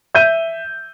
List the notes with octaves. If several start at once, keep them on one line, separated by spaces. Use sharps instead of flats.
E5 G6 D#7